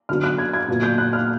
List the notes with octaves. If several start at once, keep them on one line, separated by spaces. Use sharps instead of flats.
D3 F#3 B3 F6
F#6
G#6
G#6
A#2 F#3 B3
G6
F#6
F6